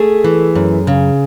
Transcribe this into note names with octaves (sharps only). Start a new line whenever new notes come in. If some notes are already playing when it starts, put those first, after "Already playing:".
Already playing: A3 G#4
E3
F#2
C#3